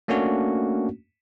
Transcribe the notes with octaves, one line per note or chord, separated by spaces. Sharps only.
A3 A#3 C#4 D4 F#4